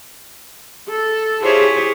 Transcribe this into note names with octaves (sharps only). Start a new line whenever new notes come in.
A4
E4 F4 G4 G#4 C5 C#5